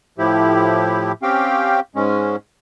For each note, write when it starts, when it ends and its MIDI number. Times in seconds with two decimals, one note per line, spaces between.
0.18 1.12 45
0.18 1.12 53
0.18 1.12 64
0.18 1.12 67
1.23 1.80 60
1.23 1.80 61
1.23 1.80 67
1.23 1.80 77
1.23 1.80 79
1.95 2.36 44
1.95 2.36 56
1.95 2.36 61